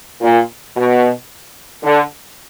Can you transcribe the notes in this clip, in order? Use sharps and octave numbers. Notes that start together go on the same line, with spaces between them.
A#2
B2
D3